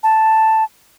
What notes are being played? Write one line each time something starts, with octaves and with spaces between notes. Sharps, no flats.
A5